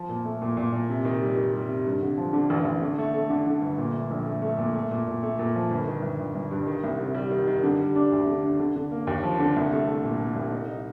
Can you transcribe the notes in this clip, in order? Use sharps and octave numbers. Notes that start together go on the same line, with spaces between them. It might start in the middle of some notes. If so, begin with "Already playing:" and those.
Already playing: F3
A#2
A3
A#2
A#2
A#2
C3
D#3
G3
D#3
G3
C3
G2
D3
F3
D3
A1
A1
D3
A3
A3
D3
D3
G1
A#2
A3
A#1
A3
A3
A#2
A3
A#2
A#2
A3
A#2
F3
G1
D#3
G1
G1
G1
G2
D#3
C2
C3
G3
D#3
D#3
D3
G3
D4
D2
D3
D4
D3
D3
A#3
D#2
F3
D3
C2
A3
A3
A#2
A#2
C2
D#4
D#4